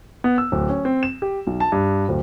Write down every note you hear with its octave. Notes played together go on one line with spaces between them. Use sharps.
B3
E6
D1
C#4
C4
E7
G4
B1
A5
G2
D1